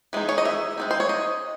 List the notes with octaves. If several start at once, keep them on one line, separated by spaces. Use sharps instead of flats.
E3 G#3 D#4
C#5
D#5
E5
G#3 C4 D#4
C5
C#5
D#5